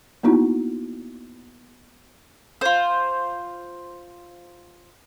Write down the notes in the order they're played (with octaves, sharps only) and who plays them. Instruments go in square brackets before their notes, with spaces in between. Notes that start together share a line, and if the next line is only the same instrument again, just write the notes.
[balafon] A#3 B3 D#4 E4 F#4
[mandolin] F4 C5